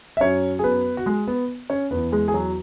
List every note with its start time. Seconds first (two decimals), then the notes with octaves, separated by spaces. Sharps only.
0.17 E5
0.20 F#2 F#3 C#4 C#5
0.59 G#4
0.64 B3 B4
0.97 F#4
1.06 G#3 G#4
1.27 B3 B4
1.70 C#4 C#5
1.91 E2 E3 B3 B4
2.12 G#3 G#4
2.28 G#4
2.34 F#3 F#4